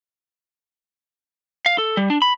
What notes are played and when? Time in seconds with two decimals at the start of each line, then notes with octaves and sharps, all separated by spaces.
1.66 F5
1.78 A4
1.97 G3
2.10 D4
2.22 B5